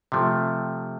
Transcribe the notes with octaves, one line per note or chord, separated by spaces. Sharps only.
C3 F3 A3